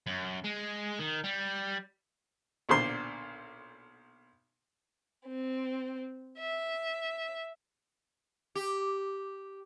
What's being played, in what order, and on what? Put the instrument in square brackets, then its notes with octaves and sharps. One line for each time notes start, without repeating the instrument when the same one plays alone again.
[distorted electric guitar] F#2
G#3
D#3
G3
[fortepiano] B1 A#2 D3 C5 C6
[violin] C4
E5
[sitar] G4